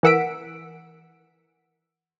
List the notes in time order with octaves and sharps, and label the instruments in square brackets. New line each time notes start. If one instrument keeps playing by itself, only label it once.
[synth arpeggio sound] E3 A#4 F#5 E6 B6 D7